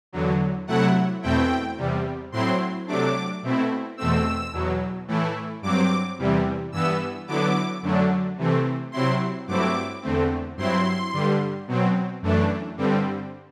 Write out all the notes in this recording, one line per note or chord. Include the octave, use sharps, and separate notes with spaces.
E2 D3 F#3
C3 F#3 A3 E4 F#5
E2 B2 A3 C4 E4 G5
E2 C3 G3
A2 F#3 C4 E4 C6
C3 F#3 A3 D4 D6
B2 A3 C4 E4
E2 B2 A3 C4 E6
E2 B2 F#3
A2 E3 A3 E4
G2 F#3 C4 D6
E2 C3 E3 G3
G2 E3 B3 E6
D3 F#3 B3 E4 D6
F#2 D3 F#3 A3 D4
C3 E3 A3 C4
C3 F#3 C4 E4 C6
G2 F#3 A3 C4 E4 D6
E2 D3 A3 C4
G2 F#3 C4 E4 C6
G2 D3 G3
B2 F#3 C4
F#2 E3 A3 D4
G2 D3 G3 C4